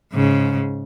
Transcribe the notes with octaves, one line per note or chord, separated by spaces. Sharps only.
G#2 C#3